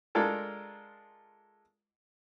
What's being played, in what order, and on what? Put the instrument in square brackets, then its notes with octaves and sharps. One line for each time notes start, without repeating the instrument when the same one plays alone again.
[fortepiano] G#3 D4 F4 A4 A#4